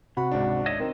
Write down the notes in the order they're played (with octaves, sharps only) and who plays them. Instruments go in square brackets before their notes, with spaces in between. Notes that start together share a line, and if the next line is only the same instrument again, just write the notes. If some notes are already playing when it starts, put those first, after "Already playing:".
[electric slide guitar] C3 [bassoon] F#4 [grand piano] B5
[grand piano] G#1 C#2 D4
[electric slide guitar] C#5 D#5 E5
[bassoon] D#3 [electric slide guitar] C4